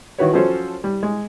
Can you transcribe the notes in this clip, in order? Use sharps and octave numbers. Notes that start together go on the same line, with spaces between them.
D#3 E4 F#4 B4 C#5
F3 F#3 C#4 A4 C5 C#5
G3
G#3